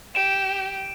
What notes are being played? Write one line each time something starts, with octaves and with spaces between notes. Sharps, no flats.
G4 D7 E7